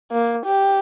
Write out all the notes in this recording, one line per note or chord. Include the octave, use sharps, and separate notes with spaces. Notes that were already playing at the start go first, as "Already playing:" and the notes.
A#3
G4